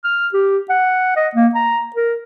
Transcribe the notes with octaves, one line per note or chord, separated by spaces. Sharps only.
F6
G4
F#5
D#5
A#3
A#5
A#4